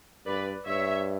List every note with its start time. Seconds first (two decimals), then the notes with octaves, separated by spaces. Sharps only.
0.27 G2 B4 D5
0.67 G2 C#5 E5